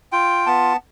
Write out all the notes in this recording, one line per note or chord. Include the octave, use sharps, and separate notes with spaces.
F4 G5
B3 A5